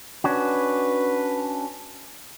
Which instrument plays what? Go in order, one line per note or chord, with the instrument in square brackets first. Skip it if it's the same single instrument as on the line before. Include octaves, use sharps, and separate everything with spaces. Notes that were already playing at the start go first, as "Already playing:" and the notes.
[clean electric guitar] C#4 D4 F#4 [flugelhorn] B4